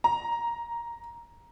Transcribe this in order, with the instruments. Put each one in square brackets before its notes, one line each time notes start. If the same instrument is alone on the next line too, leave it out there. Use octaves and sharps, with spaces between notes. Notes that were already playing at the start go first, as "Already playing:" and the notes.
[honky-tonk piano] A#5